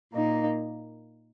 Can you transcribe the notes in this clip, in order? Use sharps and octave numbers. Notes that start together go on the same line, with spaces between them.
A#2 A#3 D#4